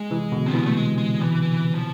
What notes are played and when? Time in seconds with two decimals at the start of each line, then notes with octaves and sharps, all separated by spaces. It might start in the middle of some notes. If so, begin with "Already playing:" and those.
Already playing: G#3
0.11 C3 E3
0.32 B2 D3
0.46 C4
0.54 C3 E3 B3
0.66 A3
0.76 G#3
0.98 G#3
1.20 E3
1.42 E3
1.75 F3